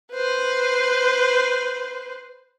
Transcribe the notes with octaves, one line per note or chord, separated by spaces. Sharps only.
B4 C5